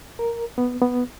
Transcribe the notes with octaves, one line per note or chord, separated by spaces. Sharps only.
A#4
B3
B3